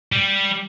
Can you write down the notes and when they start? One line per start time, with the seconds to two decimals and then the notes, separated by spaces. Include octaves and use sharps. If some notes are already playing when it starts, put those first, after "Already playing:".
0.12 G3